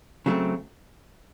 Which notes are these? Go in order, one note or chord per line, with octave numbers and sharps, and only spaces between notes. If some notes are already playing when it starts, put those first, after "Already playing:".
C#3 F#3 A3 C4